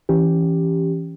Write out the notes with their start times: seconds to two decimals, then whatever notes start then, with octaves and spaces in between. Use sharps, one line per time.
0.09 E3 C#4 G4